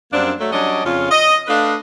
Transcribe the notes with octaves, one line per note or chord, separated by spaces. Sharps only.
F#2 G3 A#3 C4 D4
F#3 A3
F#3 G3 C#4 D4 D5 D#5
F2 C#3 C#4 F4
D#5
A3 D4 B4 D#5 F5